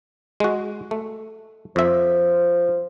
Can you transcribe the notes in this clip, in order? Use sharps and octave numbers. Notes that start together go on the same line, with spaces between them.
G#3 F#4
A3
F2 F3 E5